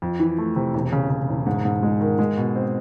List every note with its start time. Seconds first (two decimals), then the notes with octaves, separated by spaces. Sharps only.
0.02 F2
0.20 E3
0.38 A3
0.56 C3
0.74 E1
0.93 C#3
1.10 C#3
1.29 E1
1.46 G#2
1.65 G#2
1.83 G#3
2.01 D#3
2.19 G#3
2.37 B2
2.56 C4